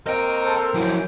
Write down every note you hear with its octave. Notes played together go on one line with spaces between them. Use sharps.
A#3 C4 A#4 D#5 G5
A4 C5
F#2 F3 F#3 E4 G5